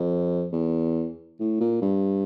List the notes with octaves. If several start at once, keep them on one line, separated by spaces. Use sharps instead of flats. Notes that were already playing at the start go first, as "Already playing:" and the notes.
Already playing: F2
E2
A2
A#2
G2